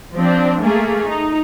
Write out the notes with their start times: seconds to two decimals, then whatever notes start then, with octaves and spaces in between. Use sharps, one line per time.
0.15 F3 C4 D4
0.63 A3 A#3 G#4
1.06 D#4